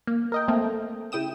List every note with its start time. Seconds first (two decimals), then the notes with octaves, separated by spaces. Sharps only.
0.07 A#3
0.32 A#4 D#5 G5
0.48 A3 A#3 C4
1.12 C#3 E4 G5 D#6 E7